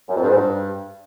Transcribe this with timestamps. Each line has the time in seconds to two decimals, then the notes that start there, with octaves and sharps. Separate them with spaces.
0.08 F#2
0.15 F2
0.22 G2
0.29 G#2
0.36 G2